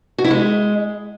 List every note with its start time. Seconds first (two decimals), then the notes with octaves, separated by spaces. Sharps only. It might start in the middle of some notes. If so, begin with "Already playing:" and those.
0.18 F#4
0.25 E4
0.31 G#3